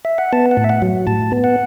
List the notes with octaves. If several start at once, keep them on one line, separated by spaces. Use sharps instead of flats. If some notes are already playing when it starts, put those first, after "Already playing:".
E5
F#5
B3 A5
F#5
A2
E5
F#5
F#3
A2 A5
B3
F#5